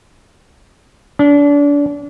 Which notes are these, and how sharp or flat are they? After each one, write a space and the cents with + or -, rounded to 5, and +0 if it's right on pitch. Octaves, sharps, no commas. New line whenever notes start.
D4 -30